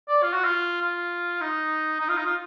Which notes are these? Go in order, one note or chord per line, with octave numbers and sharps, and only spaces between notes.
D5
F4
F#4
F4
F4
D#4
D#4
F4
D#4
F4